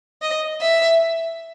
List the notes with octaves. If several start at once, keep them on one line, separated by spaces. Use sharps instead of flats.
D#5
E5